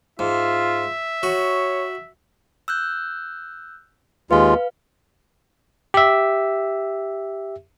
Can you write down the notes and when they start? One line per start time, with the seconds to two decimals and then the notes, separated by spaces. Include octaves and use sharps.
0.19 G#2 F4 E5
1.23 F#4 C#5
2.68 E6 F#6 G6
4.31 D#2 G#3 F4 B4 F5
5.94 G4 E5